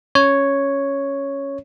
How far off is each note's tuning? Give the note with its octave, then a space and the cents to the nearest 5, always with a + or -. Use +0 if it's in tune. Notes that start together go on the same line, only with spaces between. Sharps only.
C#4 +0 C#5 +0